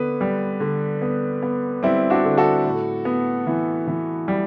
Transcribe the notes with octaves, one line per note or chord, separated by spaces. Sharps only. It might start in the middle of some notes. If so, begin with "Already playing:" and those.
Already playing: D3 B3 B4
G3
D3
B3
B3
G3 C4 E4
D4 F#4
D3
F#4 A4
A2
B3
E3
E3
G3